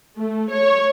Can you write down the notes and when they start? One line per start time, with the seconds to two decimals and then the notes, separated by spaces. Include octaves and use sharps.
0.17 A3
0.50 C#5